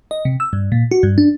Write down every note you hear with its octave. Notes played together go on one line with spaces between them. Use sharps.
D#5
C3
E6
G2
A#2
F#4
G2
D4